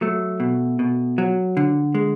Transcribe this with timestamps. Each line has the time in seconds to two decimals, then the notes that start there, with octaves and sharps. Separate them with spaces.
0.01 F#3 A3
0.40 B2
0.79 B2
1.18 F#3
1.57 D3
1.95 G#3